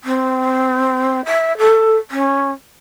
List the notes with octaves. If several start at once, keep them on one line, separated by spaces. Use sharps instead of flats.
C4
E5
A4
C#4